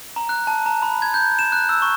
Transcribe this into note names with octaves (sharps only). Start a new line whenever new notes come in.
A#5
F#6
A5
A#5
B5
G#6
G6
E7
F#6
E6
C#6